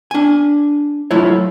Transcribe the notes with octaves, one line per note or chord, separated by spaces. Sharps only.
D4 G#5
F#3 A3 E4 F4 C#5